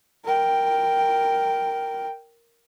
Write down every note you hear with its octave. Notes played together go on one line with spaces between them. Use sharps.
A#4 G5